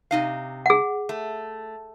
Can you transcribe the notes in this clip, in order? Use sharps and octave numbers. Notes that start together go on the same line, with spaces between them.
C3 D#4 F5
G#4 F#5
A3